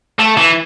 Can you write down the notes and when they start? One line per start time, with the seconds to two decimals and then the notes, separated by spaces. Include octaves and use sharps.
0.20 A3
0.38 E3